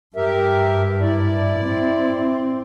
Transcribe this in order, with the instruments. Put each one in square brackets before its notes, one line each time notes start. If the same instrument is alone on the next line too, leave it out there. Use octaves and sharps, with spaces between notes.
[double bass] G2 [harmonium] G4 A#4 E5
[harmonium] E4 D5
[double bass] C4